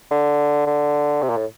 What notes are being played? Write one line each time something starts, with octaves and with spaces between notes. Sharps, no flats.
D3
D3
C3
A#2
A2